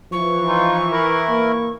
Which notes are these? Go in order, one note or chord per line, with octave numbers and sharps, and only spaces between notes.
E3 F3 C#6
D#4 F4
E4 A#4
A#3